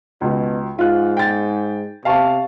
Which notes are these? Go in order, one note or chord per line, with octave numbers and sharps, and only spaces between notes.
C#2 B2
G#2 F4 F#6
G5 A6
C3 F5 A5 C#6